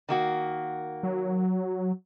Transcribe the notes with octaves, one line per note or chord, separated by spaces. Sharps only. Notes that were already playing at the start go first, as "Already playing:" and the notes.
D#3 A#3 F#4
F#3